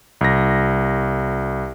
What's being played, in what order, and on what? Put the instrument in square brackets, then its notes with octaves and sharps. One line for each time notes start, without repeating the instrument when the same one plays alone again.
[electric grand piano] C2 A#6